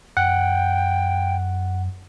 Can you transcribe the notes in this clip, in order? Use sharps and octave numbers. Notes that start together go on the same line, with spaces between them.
F#2 F#5 G5